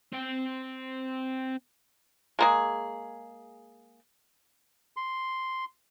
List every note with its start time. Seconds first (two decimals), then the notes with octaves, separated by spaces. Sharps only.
0.13 C4 G5
2.39 G#3 A#3 G#4
4.97 C6